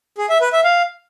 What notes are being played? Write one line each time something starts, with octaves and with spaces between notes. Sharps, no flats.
G#4
E5
B4
E5
F5